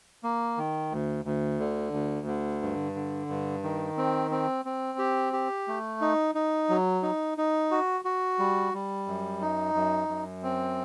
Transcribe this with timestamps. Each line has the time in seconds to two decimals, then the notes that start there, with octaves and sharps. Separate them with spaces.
0.23 A#3
0.58 D#3
0.92 D2
1.25 D2
1.60 D3
1.93 D2
2.27 D3
2.62 G2
2.95 D3
3.29 G2
3.64 D#3
3.97 C4
4.31 C4
4.65 C4
4.99 G4
5.33 G4
5.68 A3
6.01 D#4
6.35 D#4
6.69 F#3
7.03 D#4
7.38 D#4
7.71 F#4
8.05 F#4
8.39 G3
8.74 G3
9.07 F#2
9.42 D#4
9.74 F#2
10.09 F#2
10.43 C4